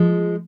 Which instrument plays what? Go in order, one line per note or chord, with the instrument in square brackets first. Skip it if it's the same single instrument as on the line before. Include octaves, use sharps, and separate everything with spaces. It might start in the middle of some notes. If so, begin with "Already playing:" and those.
Already playing: [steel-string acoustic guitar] F3 G#3